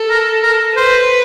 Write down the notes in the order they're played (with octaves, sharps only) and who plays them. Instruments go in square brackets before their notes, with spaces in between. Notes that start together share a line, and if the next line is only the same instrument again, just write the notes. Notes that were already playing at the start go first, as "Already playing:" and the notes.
Already playing: [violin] A4
[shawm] A#4
A#4
[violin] B4 [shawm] C5